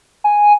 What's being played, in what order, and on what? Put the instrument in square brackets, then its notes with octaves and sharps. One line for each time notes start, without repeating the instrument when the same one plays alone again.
[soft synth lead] G#5